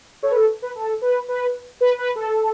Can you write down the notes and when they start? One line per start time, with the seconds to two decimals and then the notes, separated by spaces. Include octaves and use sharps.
0.23 A4 C#5
0.31 B4
0.36 A4
0.62 B4
0.75 A4
1.02 B4
1.28 B4
1.81 B4
1.98 B4
2.16 A4